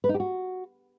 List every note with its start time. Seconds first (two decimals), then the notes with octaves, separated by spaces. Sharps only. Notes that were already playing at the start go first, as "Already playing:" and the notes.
0.04 B4
0.09 D#4
0.14 G4
0.20 F#4